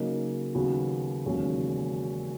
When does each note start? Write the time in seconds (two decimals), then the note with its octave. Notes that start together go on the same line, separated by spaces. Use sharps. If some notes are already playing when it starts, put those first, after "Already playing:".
Already playing: C#3 F#3 A#3 D#4
0.54 D#2 C#3 F#3 B3 F#4
1.26 E1 D#2 C#3 F#3 C#4